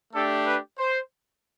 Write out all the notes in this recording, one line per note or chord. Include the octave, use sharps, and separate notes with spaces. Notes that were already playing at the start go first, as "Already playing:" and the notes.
A3 D4 G4 A4
B4
C5